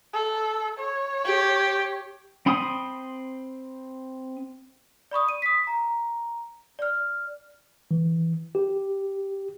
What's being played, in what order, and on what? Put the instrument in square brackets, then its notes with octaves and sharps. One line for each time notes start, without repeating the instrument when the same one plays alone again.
[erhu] A4
C#5
[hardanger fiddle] G4
[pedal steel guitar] C4 B5 C6 D#6
[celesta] D5 B5 C#6 D#6
D#7
D#6 B6
A#5
D5 F6
[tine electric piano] E3
G4